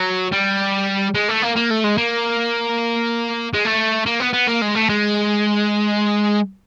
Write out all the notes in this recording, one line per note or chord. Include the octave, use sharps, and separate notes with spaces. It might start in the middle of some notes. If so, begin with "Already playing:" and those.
Already playing: F#3
G3
G#3
A3
A#3
A#3
A3
G#3
A#3
G#3
A3
A#3
B3
B3
A#3
G#3
A3
G#3